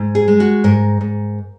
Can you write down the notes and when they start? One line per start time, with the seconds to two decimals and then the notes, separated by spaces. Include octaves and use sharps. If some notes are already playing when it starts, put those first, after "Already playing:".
Already playing: G#2
0.15 G#4
0.28 G#3
0.40 F#4
0.64 G#2 A#4
1.01 G#2